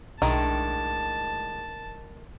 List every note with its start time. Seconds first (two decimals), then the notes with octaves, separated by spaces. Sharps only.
0.22 B1 A2 D#3 G#3 D4 A5